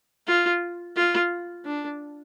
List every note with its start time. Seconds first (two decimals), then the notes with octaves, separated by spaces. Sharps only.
0.27 F4
0.96 F4
1.65 D4